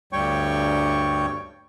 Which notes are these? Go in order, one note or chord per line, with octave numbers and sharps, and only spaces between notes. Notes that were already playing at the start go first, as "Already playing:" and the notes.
D2 G2 G3 C#5 G5 C#6